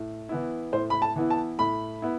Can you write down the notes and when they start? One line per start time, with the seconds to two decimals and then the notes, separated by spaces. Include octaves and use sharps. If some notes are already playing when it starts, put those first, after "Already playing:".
Already playing: A2
0.29 E3 B3 E4
0.73 A2 C5
0.90 B5
1.02 A5
1.16 E3 B3 E4
1.30 A5
1.59 A2 B5
2.02 B3 E4